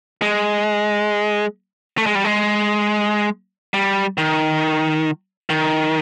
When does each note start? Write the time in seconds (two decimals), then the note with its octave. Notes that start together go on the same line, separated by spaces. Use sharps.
0.22 G#3
1.98 A3
2.06 G#3
2.15 G3
2.24 G#3
3.74 G3
4.18 D#3
5.50 D#3